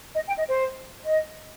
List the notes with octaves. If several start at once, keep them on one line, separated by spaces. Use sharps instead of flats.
D#5
G5
D#5
C5
D#5